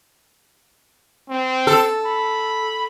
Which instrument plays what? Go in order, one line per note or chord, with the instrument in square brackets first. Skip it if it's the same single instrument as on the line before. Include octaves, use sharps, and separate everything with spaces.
[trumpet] C4
[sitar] A4
[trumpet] B5